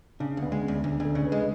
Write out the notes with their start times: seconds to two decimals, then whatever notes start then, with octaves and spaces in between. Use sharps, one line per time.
0.20 C#3 D4
0.37 D2
0.42 B3
0.52 G#3
0.63 C#4
0.68 D2
0.84 D2 D4
1.00 D2
1.05 A4
1.15 C#3
1.27 B4
1.32 G#3
1.40 B4